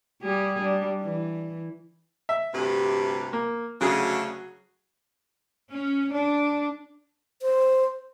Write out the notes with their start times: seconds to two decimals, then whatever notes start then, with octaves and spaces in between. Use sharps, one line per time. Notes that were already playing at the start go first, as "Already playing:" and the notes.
0.21 G3 G4 G#4
0.62 G3 D4
1.02 E3
2.29 E5
2.54 D2 G2 C3
3.33 A#3
3.81 D2 C#3 F#3 G#4
5.72 C#4
6.12 D4
7.42 C5